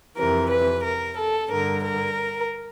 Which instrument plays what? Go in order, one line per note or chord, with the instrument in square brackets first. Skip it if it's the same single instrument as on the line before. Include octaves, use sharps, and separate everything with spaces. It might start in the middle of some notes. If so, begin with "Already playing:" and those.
[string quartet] F2 C3 E3 A#4
B4
A#4
A4
G2 D3 A#4
A#4